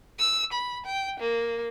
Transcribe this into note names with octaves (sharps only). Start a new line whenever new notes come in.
E6
B5
G5
A#3